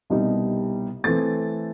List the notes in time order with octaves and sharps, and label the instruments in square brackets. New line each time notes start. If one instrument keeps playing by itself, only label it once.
[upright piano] C2 B2 G3 D#4
E3 A3 C4 A6